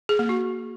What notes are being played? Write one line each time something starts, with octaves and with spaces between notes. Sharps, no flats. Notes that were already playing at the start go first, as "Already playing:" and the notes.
G#4
A#3
F#4